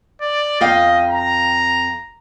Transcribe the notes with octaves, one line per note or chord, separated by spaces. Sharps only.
D5
F2 D#5 F5 G5
A#5